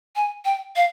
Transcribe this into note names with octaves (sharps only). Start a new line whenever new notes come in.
G#5
G5
F5